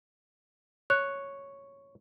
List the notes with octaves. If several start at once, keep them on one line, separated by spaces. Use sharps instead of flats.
C#5 F#6